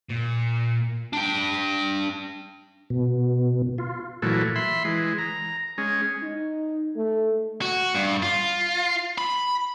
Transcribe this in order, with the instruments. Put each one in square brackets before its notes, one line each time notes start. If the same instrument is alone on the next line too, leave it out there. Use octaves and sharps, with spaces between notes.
[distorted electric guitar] A#2
[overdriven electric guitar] D4 G5
[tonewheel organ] B2
F4
[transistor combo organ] A#2 E3 F#3 A3
E5 B5 C6
E3 G#3
A#5
G#3 C#4
[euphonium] D#4
A3
[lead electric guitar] F#4
G2
F4
B5